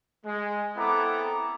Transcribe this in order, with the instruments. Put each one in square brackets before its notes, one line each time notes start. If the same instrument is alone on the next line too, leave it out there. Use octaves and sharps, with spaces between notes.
[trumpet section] G#3
B3 C4 E4 A4 A#5 D6